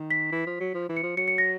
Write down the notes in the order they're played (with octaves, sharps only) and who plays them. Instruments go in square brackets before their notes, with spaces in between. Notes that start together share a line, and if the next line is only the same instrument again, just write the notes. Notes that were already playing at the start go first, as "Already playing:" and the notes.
Already playing: [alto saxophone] D#3
[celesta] B6
[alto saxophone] E3
F3
F#3
F3
E3
[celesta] C#7
[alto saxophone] F3
[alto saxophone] F#3 [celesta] C#7
[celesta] C#7
A#6